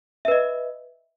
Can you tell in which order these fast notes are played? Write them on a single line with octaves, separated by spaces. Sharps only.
E5 B4 D#5